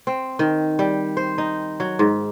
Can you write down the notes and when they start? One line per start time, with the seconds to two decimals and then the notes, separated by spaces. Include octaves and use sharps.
0.07 C4
0.39 D#3
0.79 G3
1.17 C5
1.38 D#4
1.80 F#3
1.99 G#2